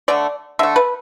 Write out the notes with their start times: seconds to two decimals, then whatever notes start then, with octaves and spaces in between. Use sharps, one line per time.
0.08 D3 A3 D5
0.59 D3 A3 E5
0.76 B4